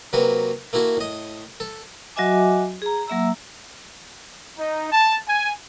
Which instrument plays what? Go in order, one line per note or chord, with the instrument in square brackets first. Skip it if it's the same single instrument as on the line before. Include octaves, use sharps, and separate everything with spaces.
[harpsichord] C3 F#3 A#3 F#4 B4
A3 A#3 E4 F#4
A2 D#5
A4
[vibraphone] F#3 F#4 D#5 E5 G#5 D6
G#4 A#5
F#3 A#3 E5 A#5 E6
[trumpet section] D#4
A5
G#5